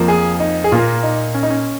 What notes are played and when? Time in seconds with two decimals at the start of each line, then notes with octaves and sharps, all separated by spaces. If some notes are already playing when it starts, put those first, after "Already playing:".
Already playing: F2 F3 A#3
0.08 G#4
0.40 D#4
0.64 G#4
0.71 A#2 A#3 F4
1.03 D#4
1.34 C#4
1.43 D#4
1.50 C#4